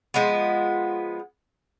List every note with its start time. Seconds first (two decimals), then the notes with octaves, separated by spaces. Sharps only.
0.14 F3 G#3 B3